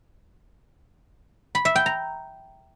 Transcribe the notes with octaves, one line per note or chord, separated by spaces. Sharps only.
B5
E5
G5
A#5